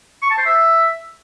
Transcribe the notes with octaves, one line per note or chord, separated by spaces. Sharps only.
C#6
A5
C5
E5